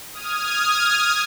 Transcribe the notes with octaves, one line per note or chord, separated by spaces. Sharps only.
D#6 F6 G#6